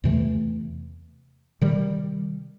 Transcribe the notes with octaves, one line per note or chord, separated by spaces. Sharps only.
E2 C3 E3 A3
C3 D#3 G3